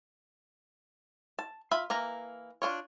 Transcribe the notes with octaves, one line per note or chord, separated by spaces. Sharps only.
A5
F4 E5 B5
E3 A#3 A#5
D4 F4 C#5